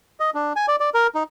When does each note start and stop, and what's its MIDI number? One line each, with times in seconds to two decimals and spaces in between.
0.20 0.30 75
0.34 0.53 62
0.56 0.66 80
0.68 0.76 74
0.80 0.90 74
0.94 1.07 70
1.15 1.23 63